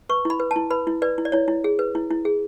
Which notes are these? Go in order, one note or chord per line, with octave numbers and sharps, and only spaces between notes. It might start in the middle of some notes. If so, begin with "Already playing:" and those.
B4 C#6
E4 B5
B4
A5
E4
B4 B5
E4
B4 D5
E4
D5
E4 C#5
E4
G#4
B4
E4
E4
G#4